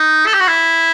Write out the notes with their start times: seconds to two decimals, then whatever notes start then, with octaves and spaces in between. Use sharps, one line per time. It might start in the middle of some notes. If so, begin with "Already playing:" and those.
Already playing: D#4
0.26 A4
0.34 G4
0.40 F#4
0.48 E4